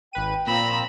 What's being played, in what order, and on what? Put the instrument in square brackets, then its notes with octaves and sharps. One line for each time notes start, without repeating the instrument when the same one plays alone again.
[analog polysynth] G#1 B4 D#7 [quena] G5
[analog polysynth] A#2 E7 [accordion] F3 C4 A#5 [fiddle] B5